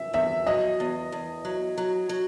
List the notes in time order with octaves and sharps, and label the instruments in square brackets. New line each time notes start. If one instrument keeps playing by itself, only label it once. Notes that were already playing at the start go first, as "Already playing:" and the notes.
Already playing: [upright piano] E5
[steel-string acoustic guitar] E2 [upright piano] E5
[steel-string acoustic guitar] F#3 [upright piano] D#5
[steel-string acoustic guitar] E2
E2
F#3
F#3
F#3